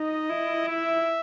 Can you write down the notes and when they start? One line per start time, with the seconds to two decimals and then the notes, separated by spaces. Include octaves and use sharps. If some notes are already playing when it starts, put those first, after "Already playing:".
Already playing: D#4 D#5
0.30 E4
0.68 E5